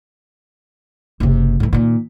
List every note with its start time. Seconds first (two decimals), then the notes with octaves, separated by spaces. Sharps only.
1.20 F#1 C3
1.60 A2 E3
1.73 A#2 D#3